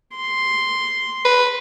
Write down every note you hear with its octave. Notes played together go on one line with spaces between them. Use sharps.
C6
B4